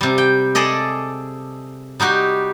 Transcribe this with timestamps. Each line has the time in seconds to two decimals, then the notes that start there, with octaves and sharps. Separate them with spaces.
0.01 C3 G3
0.18 G5
0.55 G#4 A4 D5 D#5
2.00 G3 D#4 F#4 G4